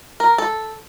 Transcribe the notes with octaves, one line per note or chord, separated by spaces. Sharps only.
A#4
A4